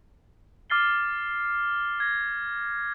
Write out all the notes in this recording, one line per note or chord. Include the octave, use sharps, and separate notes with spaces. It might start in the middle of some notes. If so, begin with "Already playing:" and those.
D6 F6 A6 C7 G7
G#6 A#6